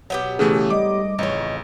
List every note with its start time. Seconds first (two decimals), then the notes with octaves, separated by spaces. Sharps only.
0.10 B2 F#3 B3 G4
0.39 C#3 E3 A3 G#4
0.70 G#2 G3 A3 D#5 D6
1.19 A1 F2 C#3 D#4 C#5